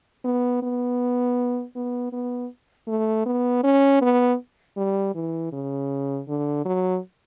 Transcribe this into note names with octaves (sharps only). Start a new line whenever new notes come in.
B3
B3
B3
B3
A3
B3
C#4
B3
G3
E3
C#3
D3
F#3